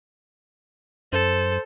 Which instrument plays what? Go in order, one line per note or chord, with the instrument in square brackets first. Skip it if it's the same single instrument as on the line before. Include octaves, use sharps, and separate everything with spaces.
[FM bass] F#2 [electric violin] A4 [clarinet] C5